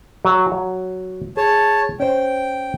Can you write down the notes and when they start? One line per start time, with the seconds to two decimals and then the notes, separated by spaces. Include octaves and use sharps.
0.25 F#3
0.52 F#3
1.37 G#4 C#5 A5
2.00 C#4 C5 G5